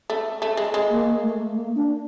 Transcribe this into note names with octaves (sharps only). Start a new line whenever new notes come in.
A3
A3
G#3
G#3
A#3
A3
A#3
D4